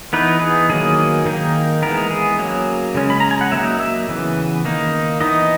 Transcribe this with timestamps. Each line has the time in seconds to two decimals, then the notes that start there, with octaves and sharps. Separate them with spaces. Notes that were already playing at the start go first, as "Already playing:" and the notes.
0.13 E3 B3 D#4 B4
0.41 G#4
0.70 D#3 F#3 A#3 G#4
1.26 D#3 A#3 D#4
1.82 E3 G#3 B3 A#4
2.10 G#4
2.39 F#3 A#3 C#4
2.94 C#3 G#3 C#4
3.10 B5
3.20 A#5
3.31 G#5
3.41 F#5
3.52 F#3 A#3 D#4 E5
3.80 E5
4.08 C#3 E3 B3
4.65 D#3 A#3 D#4
5.20 E3 B3 D#4 D#5